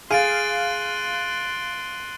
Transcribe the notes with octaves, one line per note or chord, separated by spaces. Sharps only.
G#4 F5 C6 F#6 A6 D7 D#7